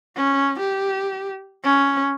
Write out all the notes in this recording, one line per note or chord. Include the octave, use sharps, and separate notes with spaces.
C#4
G4
C#4